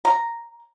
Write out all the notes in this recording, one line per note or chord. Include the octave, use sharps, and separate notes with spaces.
A#5